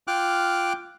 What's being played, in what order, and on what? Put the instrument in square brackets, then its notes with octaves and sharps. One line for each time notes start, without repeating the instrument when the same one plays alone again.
[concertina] F4 G5 D6 F6 F#6